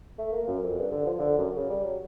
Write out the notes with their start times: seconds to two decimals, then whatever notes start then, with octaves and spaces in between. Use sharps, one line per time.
0.18 A3
0.32 A#3
0.48 F#2
0.63 F2
0.79 G2
0.91 D3
1.06 F3
1.19 D3
1.38 F#2
1.56 C#3
1.70 G3
1.84 F#3